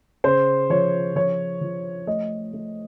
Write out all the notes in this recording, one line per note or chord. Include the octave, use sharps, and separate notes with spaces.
C#3 C5
F3 C#5
F3 C#5
F3
A3 D#5
A3